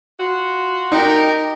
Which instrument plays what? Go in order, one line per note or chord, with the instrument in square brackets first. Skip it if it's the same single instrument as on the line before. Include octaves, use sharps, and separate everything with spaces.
[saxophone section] F4 F#4
[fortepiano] D#4 [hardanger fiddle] G4 A#4